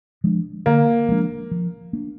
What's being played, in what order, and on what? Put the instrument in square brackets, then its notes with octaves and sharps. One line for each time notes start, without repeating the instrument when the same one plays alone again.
[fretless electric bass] F3 G#3 D4
[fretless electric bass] D3 [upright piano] A#3
[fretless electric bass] F3 G#3 D4
F3
A#3 D4